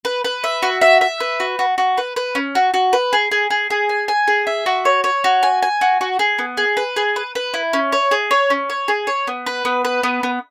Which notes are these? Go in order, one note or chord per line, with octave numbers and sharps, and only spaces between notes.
B4
B4
E5
F#4
E5
E5
B4
F#4
F#4
F#4
B4
B4
C#4
F#4
F#4
B4
G#4
G#4
G#4
G#4
G#5
G#5
G#4
E5
F#4
C#5
C#5
F#4
G#5
G#5
F#4
F#4
G#4
B3
G#4
B4
G#4
B4
B4
E4
C#4
C#5
G#4
C#5
C#4
C#5
G#4
C#5
B3
B4
B3
B4
B3
B3